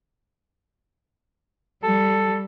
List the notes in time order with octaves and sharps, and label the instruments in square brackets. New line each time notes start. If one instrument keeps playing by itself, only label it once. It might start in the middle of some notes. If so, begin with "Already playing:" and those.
[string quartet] G3 [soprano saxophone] A4